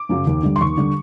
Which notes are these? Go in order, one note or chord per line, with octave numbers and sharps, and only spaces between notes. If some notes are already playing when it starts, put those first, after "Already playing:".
Already playing: D6
F#2 C#3 F#3
D#2
D3 G3
C6
D#2 C#6
D3 G3